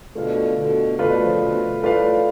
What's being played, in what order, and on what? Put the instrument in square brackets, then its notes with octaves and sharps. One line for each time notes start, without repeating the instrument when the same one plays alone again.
[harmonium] B2 D3 [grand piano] A3 F4 B4 D5 F5
[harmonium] B2 D3
[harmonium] B2 D3 [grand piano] A3 F4 B4 D5 F5
[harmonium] D3
C#3 F3
B2 D3
[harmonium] A2 [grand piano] A3 F4 B4 D5 F5